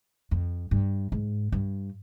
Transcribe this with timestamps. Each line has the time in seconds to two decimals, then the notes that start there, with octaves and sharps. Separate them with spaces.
0.31 F2
0.71 G2
1.12 G#2
1.52 G2